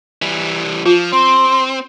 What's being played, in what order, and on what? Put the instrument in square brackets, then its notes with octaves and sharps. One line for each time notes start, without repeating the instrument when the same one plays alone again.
[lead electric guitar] E3 G3
[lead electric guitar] F3 [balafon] F4
[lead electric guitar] C4 [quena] C6